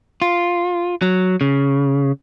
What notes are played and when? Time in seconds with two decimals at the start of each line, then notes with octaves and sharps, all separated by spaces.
0.22 F4
1.02 F#3
1.41 C#3